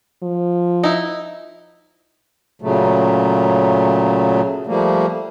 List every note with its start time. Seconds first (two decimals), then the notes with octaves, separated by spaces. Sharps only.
0.23 F3
0.84 D#4 E4
2.62 A#2 C#3 F#3 A3
4.67 F3 G3 A3 A#3